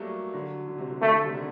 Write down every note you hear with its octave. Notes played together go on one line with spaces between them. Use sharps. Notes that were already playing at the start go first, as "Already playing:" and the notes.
Already playing: F#3 G3 A3 A#3
D3 F#3
D3
C3
D3
D3 A3
D3
C3 D#3
D3